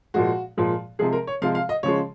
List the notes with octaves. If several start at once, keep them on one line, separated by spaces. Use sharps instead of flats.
A#2 F3 G#3 F#4
A#2 F3 G#3
C3 F3 G#3 G#4
A#4
C#5
C3 F3 G#3 F5
F5
D#5
C#3 F3 G#3 C#5